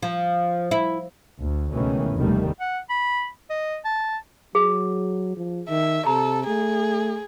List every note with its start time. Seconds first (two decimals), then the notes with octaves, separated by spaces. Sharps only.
0.02 F3
0.71 E4
1.40 D2
1.71 C#2 B2 D#3 E3 A3 C#4
2.15 F1 D#2 B2 D#3 G3 A3
2.61 F#5
2.90 B5
3.50 D#5
3.85 A5
4.55 F#3 G#4
5.37 F3
5.69 D#3 E5
6.06 C3 A4 A#5
6.47 A3 G#4